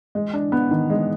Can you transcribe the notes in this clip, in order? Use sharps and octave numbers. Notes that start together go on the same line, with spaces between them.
G#3
D4
B3
D#3
G#3